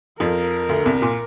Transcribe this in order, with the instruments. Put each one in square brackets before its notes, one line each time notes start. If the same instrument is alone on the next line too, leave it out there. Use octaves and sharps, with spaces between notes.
[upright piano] F2 F3 [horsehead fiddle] A#4
[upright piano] D2 D3
C2 C3
A#2